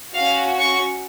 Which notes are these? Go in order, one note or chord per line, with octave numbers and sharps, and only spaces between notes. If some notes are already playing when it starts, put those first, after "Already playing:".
C#4 F#4 F5
C#6